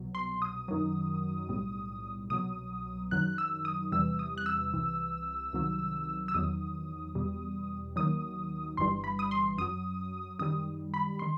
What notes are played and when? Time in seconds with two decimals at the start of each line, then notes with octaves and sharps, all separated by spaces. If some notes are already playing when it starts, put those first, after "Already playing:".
Already playing: C2 B2 F#3
0.15 C6
0.42 D#6
0.68 F#2 D#3 F#3
1.49 B1 A2 G3
2.30 C2 B2 F#3 D#6
3.11 F#2 D#3 F#3 F#6
3.38 E6
3.65 D#6
3.92 E2 C3 E3 G3 E6
4.19 D#6
4.38 F#6
4.46 E6
4.73 C2 C3 E3
5.53 C2 C3 D#3 F#3
6.28 E6
6.34 E2 D#3 F#3 D#6
7.15 E2 B2 G3
7.96 D#2 D#3 F#3 D#6
8.77 G1 G2 E3 G3 C6
9.04 B5
9.19 D#6
9.31 C6
9.58 F#2 F#3 D#6
10.39 F#2 D#3 G3 D#6
10.94 B5
11.19 D#3 C6